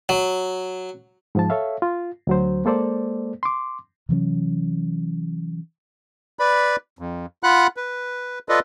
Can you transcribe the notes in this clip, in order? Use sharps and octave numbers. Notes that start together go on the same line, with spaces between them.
F#3
G#2 F3 A5
A4 C#5 E5 F5
F4
D2 F#3 C5
G#3 A#3 A4 C5 D5
C6 D6
C3 E3 F#3 C#4
B4 D5 B5
F2
F4 F#5 B5 F#6
B4
F4 A4 B4 D5 D#5